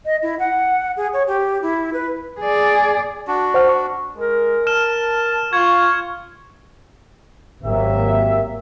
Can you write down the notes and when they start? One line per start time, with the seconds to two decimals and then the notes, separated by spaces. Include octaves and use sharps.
0.06 D#5
0.23 E4
0.40 F#5
0.97 G#4
1.13 C#5
1.27 G4
1.62 E4
1.94 B4
2.40 G#4 D5
3.27 D4 F#4
3.54 C5 F#5 F6
3.69 C#6
4.17 G#3 A#4
4.67 A5 F6 E7
5.53 F4 C#6 G#6
7.64 G#1 F#3 A#3 G4 E5